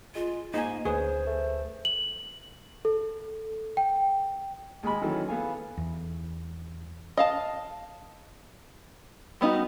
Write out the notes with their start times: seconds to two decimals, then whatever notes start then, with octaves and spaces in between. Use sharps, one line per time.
0.15 G#3 F4
0.54 G#2 A#3 D#4 G#5
0.85 D2 C#3 G#4 B4 C5
1.27 A3
1.85 F#7
2.85 A4
3.77 G5
4.83 D#2 G#3 G#5 B5
5.01 D#3 E3 F#3 C#4 A4
5.29 B3 A4 F5 G#5
5.78 E2
7.17 D#5 F5 A5
9.41 G3 B3 D#4 F4 F#4